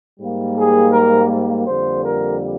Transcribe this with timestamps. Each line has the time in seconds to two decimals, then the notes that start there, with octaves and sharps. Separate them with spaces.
0.19 G#2 G3 A#3
0.56 G#4
0.93 A#4
1.67 F2 D3 G3 A#3 C5
2.04 A#4